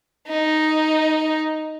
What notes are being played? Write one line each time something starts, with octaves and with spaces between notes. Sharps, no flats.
D#4